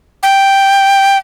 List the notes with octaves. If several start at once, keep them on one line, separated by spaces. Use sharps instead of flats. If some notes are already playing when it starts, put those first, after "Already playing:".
G5